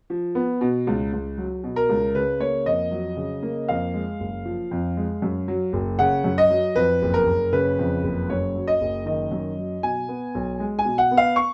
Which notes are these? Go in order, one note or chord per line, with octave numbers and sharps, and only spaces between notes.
F3
B3
B2
C#2
C#2
F#3
B2
A#4
C#2
C#3 B4
A#3 C#5
F2 D#5
F#3
C#3
A#3
F2 F5
G#3
F#1
F3
F2
G#3
F#2
F#3
F#1
C#3 F#5
F#2
D#5
F#3
F2 B4
F#1
A#4
F#1
C#3 B4
F2
F#1
F#2 C#5
F#3
D#5
F#1
D#3 D#5
F#2
F#3
B2 G#5
B3
B1
G#3
G#5
B2
F#5
B3
F5
C#6